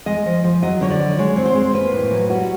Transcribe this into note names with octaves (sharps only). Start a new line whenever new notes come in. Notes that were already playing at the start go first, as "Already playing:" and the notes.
G#3 D#5
F3
F3
F#3 D#5
D3 C#5
D5
F#3
G#3 C#5
C4 C#5
C5
G#3
A#3 B4
A2
F#3
G3 F#4